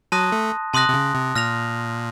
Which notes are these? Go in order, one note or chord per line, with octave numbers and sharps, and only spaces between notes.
F#3 A5 C6 D#6 F#6 A#6
A3
C3 A5 C6 D#6 F#6 A#6
C3
C#3
C3
A#2 F6 A#6 F7